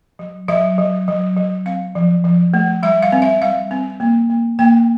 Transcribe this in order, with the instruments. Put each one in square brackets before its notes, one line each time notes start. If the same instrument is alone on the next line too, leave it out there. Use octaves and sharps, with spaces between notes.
[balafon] F#3
F#3 E5
F#3
F#3
F#3
C4 F5
F3
F3
A3
G3 E5
F5
C4
E5
G3 F5
C4
A#3
A#3
A#3 G5